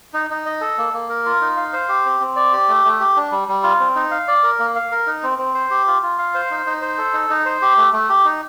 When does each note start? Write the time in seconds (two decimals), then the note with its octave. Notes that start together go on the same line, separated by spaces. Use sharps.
0.13 D#4
0.30 D#4
0.46 D#5
0.61 A4
0.78 A#3
0.93 A#3
1.09 A#4
1.26 F4
1.41 D#4
1.57 F5
1.73 C5
1.89 G4
2.05 C4
2.20 C4
2.36 D5
2.53 G4
2.68 A3
2.85 A3
3.00 G4
3.16 D4
3.32 G3
3.48 G3
3.63 F4
3.80 C4
3.95 D#4
4.11 F5
4.28 D5
4.43 A#4
4.59 A#3
4.75 F5
4.91 A#4
5.07 D#4
5.23 C4
5.38 C4
5.54 C5
5.71 G4
5.87 F4
6.02 F4
6.18 F5
6.34 C5
6.51 D#4
6.66 D#4
6.82 C5
6.98 A4
7.13 D#4
7.30 D#4
7.46 C5
7.62 G4
7.77 A3
7.93 A3
8.09 G4
8.25 D#4